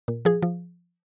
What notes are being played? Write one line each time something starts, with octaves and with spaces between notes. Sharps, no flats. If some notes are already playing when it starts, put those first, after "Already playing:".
A#2
F3 G#4
F3